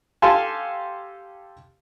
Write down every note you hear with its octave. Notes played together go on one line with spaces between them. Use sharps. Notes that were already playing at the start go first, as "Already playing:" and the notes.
G4 A4 F5 G#5 A5 C6